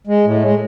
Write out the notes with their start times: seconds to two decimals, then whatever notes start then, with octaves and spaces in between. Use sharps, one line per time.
0.07 G#3
0.25 A2
0.42 G#3